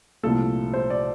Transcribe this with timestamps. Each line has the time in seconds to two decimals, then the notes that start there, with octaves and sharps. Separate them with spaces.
0.23 C2 A#2 F3 A3 A4
0.74 C5
0.90 D5